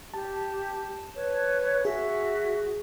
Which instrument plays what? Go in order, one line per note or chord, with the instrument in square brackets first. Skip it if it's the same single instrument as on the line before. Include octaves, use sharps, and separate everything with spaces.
[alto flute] G4 [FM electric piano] A5
[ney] B4 [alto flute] C#5
[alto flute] F#4 [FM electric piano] G#4 [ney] E5